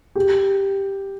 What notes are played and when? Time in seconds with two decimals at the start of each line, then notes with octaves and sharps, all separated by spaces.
0.15 G4